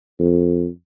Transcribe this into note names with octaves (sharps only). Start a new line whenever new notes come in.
F2